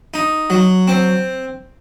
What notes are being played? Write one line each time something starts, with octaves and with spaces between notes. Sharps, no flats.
D#4
F#3
C4